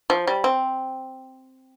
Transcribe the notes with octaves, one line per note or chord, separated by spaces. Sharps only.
F3
G3
C4